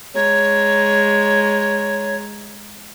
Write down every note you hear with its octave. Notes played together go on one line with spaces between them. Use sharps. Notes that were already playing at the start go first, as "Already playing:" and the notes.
G#3 C#5 A#5